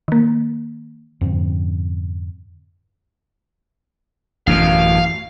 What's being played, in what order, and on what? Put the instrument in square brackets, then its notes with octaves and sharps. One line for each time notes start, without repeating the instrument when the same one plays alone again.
[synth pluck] D#3 A#3
[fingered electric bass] F2 G#2 D3 C4
[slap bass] A1 F#2 B2 [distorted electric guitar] F5